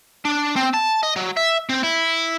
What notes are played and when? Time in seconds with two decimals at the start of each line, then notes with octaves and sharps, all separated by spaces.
0.25 D4
0.56 C4
0.74 A5
1.03 D#5
1.16 F#3
1.37 E5
1.69 C4
1.83 E4